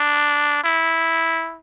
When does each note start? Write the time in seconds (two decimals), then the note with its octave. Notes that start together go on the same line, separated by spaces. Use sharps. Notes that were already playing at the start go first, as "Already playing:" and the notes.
Already playing: D4
0.64 E4